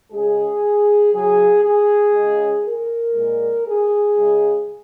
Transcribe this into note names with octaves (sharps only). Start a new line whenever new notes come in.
C#3 G#3 G#4
C#3 F#3 G#4
G#4
C#3 G#3
A#4
A#2 G#3
G#4
C#3 G#3